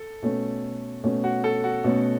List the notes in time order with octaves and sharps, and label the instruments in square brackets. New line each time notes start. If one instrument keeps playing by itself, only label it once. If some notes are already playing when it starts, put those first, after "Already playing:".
Already playing: [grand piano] A4
[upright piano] B2 A3 C#4
B2 A3 C#4
[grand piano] F#4
A4
F#4
[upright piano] B2 A3 C#4